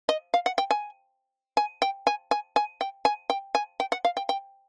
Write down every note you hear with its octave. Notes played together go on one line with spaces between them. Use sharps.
D#5
F5
F#5
G5
G#5
G#5
G5
G#5
G#5
G#5
G5
G#5
G5
G#5
G5
F#5
F5
G5
G5